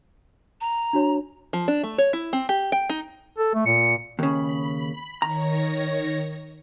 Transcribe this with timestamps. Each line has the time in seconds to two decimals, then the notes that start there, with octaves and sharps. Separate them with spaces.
0.61 A#5
0.93 D4 F#4 C#5
1.53 F3
1.68 D4
1.83 A3
1.98 C#5
2.13 E4
2.33 C4
2.49 G4
2.72 G5
2.89 D#4
3.38 A4
3.55 A3
3.66 A#2 C#7
4.19 D#2 C#3 B5
5.22 D#3 C#5 A#5 A#6